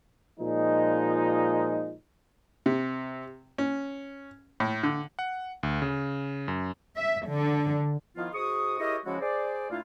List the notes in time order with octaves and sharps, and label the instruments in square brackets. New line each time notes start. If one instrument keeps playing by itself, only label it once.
[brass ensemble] A#2 F3 G#3 D#4
[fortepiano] C3
C#4
A2
D3
[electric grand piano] F#5
D2
C#3
F#2
[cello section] E5
D3
[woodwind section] D#3 F3 B3 E4 F4
G#2 F#4 G#4 C#6 D#6
E4 G4 G#4 A#4 C#5 D#5
C#3 F3 G#3 C#4 E4 F#4
G#4 C5 D5
A#2 A3 D4 E4 F4